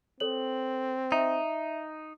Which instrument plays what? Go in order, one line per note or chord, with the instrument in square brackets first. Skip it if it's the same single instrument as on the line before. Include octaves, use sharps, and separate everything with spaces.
[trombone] C4 [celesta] A4 C#5 F#7
[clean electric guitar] D#4 [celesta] E5